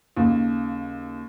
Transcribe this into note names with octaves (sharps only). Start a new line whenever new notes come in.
D#2 C#3